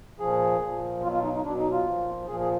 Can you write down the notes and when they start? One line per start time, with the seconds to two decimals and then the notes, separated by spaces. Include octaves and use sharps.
0.20 A#2 F3 G#4
0.61 A#2 F3
1.02 B2 F#3 F4
1.12 F4
1.23 D#4
1.33 D#4
1.44 B2 F#3 D4
1.58 D#4
1.72 F4
1.85 A#2 F3
2.27 A#2 F3 G#4
2.40 G#4